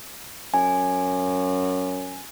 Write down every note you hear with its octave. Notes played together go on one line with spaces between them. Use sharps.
F#2 G#5